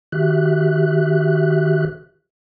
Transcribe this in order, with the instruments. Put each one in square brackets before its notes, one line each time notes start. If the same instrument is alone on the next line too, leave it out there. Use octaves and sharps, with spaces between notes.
[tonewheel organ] D#3 F#4 G4 E5 F#6